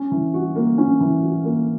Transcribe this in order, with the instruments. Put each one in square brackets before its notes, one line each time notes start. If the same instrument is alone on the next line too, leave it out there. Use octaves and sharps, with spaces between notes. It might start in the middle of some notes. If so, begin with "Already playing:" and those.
Already playing: [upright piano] C#4
E3
F#4
A#3
C#4
E3
F#4
A#3